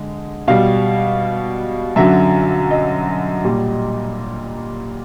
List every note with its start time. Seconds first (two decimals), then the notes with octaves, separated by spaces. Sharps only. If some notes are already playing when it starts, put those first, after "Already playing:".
Already playing: D3 G#3
0.48 B2 G3 F5
1.96 F#2 D3 F#3 E5
2.71 D#5
3.44 A#2 G3